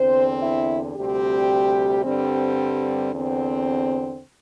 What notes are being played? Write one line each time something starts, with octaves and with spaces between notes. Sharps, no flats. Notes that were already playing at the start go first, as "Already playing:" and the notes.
Already playing: E2 D3 C4 C5
E4
D2 C3 G3 C4 G4
G2 D3 G3 C4
E2 D3 C4